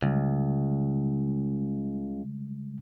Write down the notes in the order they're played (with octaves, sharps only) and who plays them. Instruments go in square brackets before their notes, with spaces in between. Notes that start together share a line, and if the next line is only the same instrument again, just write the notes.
[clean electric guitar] C#2 [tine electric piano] C#3 G3 G#3